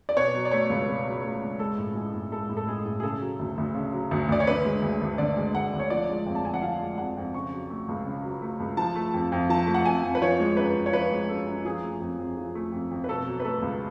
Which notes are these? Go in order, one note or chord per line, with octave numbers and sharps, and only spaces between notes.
D5
B2 C#5
F#3
D5
A3 C#5
C#2
B2
F#3
A3
C#2
G#3 A4
A2
G#3 G#4
A2
G#3 A4
A2
A4
G#3 G#4
A2
G#4
C#3 A4
F#3
D2
D2
C#3
F#3
D2
D2 D5
C#5
D3 B4
G#3
D2
D2
D3 D5
G#3
D2 F#5
D2
C#5
F3 D5
G#3
F2
A5
F2 G#5
F#5
F3 F5
G#3
F2 F#5
F2
C#3 C#6
F#3
A3
C#2
C#3
F#3
A3
C#2
F3 A5
A3
F2
F2
F3 A5
A3
F#5
F2 G#5
F2
B4
F3 C#5
G#3
F#2 B4
F#2
C#5
F3 B4
G#3
F#2 A4
F#2
F3 G#4
A3
F2
F2
F3
A3
F2
F2
B4
B2 A4
F#3
B4
A3 A4
C#2